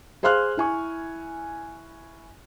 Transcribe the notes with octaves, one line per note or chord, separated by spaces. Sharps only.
G#4 C5 F5 C6 F6 F#6
E4 G#5 C#6